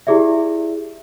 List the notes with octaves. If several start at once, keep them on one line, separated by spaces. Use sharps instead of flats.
E4 G4 G#4 D5 E5